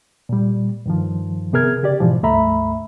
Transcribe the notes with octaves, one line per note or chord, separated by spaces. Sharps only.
A#2 G3
G2 D#3 F3
C3 B3 G#4 A#4 F6 G#6
C#3 G4 D5
G#2 B2 E3 F3
C#2 G2 A3 E5 A#5 B5